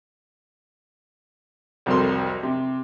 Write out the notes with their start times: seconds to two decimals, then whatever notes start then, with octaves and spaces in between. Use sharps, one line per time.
1.86 C2 F2 F#3 A4 A#4 C6
2.43 C3